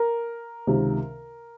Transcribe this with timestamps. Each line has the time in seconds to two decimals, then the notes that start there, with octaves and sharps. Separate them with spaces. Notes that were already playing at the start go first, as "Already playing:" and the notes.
Already playing: A#4
0.67 C#2 C3 D#3